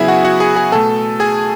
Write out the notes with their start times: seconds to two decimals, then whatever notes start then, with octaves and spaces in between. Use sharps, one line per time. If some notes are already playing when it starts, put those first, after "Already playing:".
Already playing: C#3 F#3 B3 E4 G#4 E5 G#5
0.08 F#4 F#5
0.25 F#4 F#5
0.40 G#4 G#5
0.56 G#4 G#5
0.72 B2 A3 A4 A5
1.20 G#4 G#5